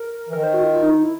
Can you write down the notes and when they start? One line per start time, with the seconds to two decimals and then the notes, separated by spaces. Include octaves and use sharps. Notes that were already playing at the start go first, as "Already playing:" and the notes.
Already playing: A#4
0.29 E3
0.33 D#3 A#4
0.43 C5
0.54 F#4
0.62 F4
0.73 F4
0.83 D#4
0.93 D#4
1.03 E4